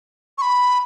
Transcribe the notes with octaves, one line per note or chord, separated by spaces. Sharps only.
C#6
B5